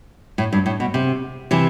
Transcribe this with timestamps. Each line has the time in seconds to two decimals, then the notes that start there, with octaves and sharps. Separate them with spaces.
0.38 A2
0.53 G2
0.66 A2
0.80 B2
0.94 C3
1.51 C3 E3